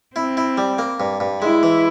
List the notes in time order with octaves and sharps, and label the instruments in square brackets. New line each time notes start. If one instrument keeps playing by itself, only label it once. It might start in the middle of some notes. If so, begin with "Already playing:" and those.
[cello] C4 [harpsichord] E4
[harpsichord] E4
G3
A#3
G2
G2
[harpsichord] G#3 [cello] E4
[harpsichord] E3